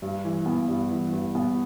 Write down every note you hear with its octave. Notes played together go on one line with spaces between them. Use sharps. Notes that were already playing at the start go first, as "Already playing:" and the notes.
G2
E3
B3
G2
E3
G2
B3